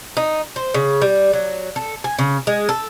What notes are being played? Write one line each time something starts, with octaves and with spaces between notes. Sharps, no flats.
D#4
C5
C#3
G3
F#3
A4
G#5
C#3
G#3
A4